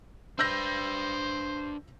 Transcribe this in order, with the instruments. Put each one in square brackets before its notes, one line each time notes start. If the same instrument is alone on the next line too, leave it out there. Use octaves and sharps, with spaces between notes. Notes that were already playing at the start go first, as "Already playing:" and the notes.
[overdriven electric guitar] D4 B4 [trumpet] C5 [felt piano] E6 G6 A#6